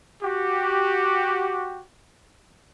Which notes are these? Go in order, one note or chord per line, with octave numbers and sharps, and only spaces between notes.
F#4 G4